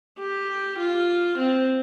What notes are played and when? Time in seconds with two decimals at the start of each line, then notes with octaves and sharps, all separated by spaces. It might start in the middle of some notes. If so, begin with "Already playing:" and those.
0.19 G4
0.79 F4
1.39 C4